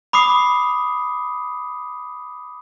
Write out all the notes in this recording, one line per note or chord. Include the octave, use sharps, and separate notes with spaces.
B5 D6 D#6 C7